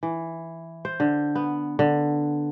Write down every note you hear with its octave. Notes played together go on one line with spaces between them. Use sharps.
E3
C5
D3
B3
D3